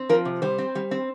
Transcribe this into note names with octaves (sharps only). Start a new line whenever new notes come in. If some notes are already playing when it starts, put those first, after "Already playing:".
Already playing: C4
F3 A#4
C3
G3 C5
C4
G3
C4